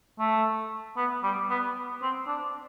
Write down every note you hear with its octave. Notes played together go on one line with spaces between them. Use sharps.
A3
B3
G3
B3
C4
D4